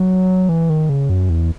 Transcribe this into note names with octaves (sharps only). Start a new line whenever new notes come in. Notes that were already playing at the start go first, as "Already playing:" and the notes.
Already playing: F#3
E3
D#3
C#3
F#2
E2